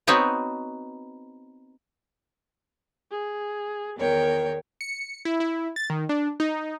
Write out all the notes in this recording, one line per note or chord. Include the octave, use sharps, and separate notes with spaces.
B3 C4 D#4 F#4 B4 C#5
G#4
E2 D#3 A#4 C#5 G5
C#7
E4
E4
A6
D#3
D4
D#4